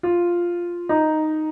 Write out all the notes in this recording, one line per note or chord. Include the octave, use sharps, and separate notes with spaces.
F4
D#4